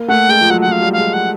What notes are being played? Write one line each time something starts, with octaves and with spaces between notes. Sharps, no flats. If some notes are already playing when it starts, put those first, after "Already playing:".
Already playing: A#3
A3 F#5
G#3 G5
F3
F#3 F#5
F#5
F3
F5
G3
F5
G#3
F#5